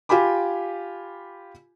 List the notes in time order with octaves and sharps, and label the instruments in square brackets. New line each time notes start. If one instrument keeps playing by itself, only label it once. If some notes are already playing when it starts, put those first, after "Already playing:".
[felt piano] F4 G4 G#5 B5 D6